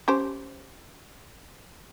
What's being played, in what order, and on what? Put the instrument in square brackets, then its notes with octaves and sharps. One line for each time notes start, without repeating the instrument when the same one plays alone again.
[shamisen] C#4 G4 C5